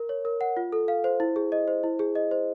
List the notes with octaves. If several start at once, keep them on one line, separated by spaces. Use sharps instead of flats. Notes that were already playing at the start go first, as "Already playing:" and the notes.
Already playing: A#4
C#5
A#4
F#5
F4
A4
F5
C5
E4
G#4
D#5
C5
E4
G#4
D#5
C5